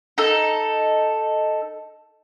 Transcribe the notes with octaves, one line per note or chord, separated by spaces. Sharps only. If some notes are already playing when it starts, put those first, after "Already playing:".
D#4 A4